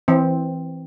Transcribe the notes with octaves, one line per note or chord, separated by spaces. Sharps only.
E3 C4